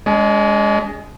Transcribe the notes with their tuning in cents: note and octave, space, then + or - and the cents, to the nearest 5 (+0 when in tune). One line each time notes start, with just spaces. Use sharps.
G#3 +0 D4 -45